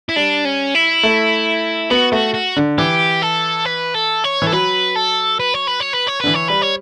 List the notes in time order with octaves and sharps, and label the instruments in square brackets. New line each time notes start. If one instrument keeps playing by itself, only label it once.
[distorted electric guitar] E4
[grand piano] G3 [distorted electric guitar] D4
[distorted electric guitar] C#4
E4
[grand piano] A3
[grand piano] B3 [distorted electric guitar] F#4
[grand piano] A3 [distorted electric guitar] F#4
[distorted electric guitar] F#4
[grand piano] D3
[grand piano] E3 [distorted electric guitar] G4
[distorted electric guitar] A4
B4
A4
C#5
[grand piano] E3 [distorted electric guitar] A4
[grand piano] F#3 [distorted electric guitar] B4
[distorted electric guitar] A4
B4
C#5
B4
C#5
B4
C#5
[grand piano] D3 [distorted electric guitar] B4
[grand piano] E3
[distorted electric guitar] C#5
[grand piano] G3 [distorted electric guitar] B4
[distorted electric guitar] C#5